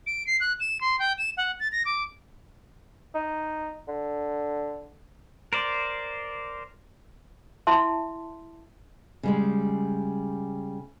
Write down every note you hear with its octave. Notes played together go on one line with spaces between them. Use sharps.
D7
C7
F#6
E7
C6
G5
E7
F#5
A6
A#6
D6
D#4
D3
A#4 C5 D5
E4 E5 A5 C6
C#3 G3 G#3